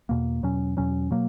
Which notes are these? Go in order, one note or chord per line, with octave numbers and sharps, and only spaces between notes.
E2 B2 A#3
E2 B2 F#3 C#4
E2 B2 F#3 C#4
B2 F#3 A#3